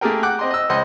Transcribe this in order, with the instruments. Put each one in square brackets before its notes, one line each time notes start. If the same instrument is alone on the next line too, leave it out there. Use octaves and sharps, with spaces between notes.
[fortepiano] A3 A#3 G4 G#4 A#4 G5
F#5 G5 D6 F#6
C4 D#5 C6
D#5 E6
C#2 C5 D#5 C6 D#6